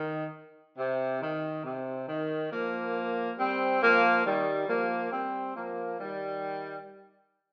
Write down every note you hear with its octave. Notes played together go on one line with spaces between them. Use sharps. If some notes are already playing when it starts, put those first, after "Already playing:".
Already playing: D#3
C3
D#3
C3
D#3
F3 A#3
G3 C4
F3 A#3
D#3 G3
F3 A#3
G3 C4
F3 A#3
D#3 G3